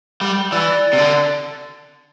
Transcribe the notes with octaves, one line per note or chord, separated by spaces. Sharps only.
G3
E3 D5
C3
D3